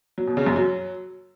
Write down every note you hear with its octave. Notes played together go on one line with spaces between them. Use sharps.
F#3
B2
C#3
F#2
F#3